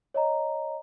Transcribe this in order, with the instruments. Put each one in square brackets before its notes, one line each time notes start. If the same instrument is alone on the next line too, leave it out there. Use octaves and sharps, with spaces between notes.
[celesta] C#5 D#5 A#5